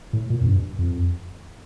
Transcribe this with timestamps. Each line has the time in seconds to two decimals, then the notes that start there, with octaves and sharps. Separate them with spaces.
0.13 A2
0.30 A#2
0.41 F2
0.46 G2
0.78 F2